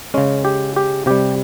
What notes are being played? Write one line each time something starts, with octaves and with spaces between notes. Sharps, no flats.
C#3 G#3 C#4
G4
G4
C3 G3 G4